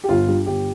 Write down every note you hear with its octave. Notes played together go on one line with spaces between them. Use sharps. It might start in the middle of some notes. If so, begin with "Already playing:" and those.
G4
G1 F4
G2 G3
G1 G4